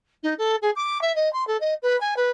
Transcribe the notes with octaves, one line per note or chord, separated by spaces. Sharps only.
D#4
A4
G#4
D6
E5
D#5
C6
A4
D#5
B4
G#5
B4